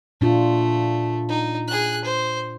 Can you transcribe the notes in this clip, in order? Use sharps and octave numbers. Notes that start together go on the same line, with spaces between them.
A#2 A3 D4 F4
D#4
G#4 F#6
C5